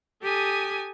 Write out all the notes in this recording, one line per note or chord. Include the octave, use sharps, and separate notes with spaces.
G4 A4 G#5 D#6